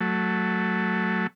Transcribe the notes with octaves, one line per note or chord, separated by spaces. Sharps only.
F#3 A3